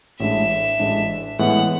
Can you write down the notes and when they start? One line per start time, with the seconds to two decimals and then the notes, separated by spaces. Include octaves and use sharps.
0.20 A1 A2 G#3 D4 E5
0.79 A1 A2 G#3 D4
1.39 A2 E3 G#3 B3 F#5